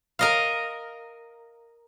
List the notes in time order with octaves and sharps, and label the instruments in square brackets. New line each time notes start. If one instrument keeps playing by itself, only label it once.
[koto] A#4 D#5 F5